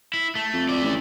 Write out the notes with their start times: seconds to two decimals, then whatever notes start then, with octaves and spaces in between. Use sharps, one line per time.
0.14 E4
0.35 A3
0.53 F2
0.69 A3 D5
0.84 A1